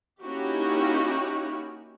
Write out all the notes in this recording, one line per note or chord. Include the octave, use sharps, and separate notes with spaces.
A#3 C#4 D#4 E4 F#4 G4